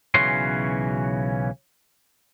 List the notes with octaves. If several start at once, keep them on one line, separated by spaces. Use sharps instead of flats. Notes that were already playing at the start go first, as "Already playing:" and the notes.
B1 C#3 E3 C#4 F#4 C6